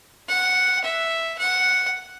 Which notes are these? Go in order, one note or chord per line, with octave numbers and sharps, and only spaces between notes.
F#5
E5
F#5